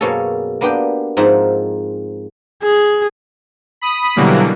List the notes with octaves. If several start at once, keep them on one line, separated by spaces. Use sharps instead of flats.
F#2 B2 A#3 C#4 G#4 A4
A#3 B3 D4 G4 G5
G#2 F3 C4 D#4 E5 F#5
G#4
B5 D#6
B2 D3 E3 F#3 G3 A#3